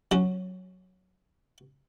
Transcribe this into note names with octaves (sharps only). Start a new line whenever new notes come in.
F#3 C#4